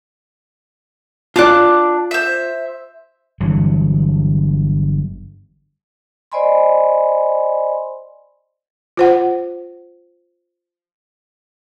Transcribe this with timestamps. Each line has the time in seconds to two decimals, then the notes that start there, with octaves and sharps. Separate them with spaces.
1.36 D4 F4 D5 D6 F#6
2.11 C5 E5
3.40 G1 G2 E3 F#3
6.32 C5 D5 D#5 G#5 B5 C6
8.97 F4 C5 F#5